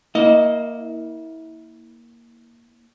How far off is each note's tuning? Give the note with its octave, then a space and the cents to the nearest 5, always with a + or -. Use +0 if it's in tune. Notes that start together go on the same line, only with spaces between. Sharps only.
A#3 +5 E4 -30 D#5 +0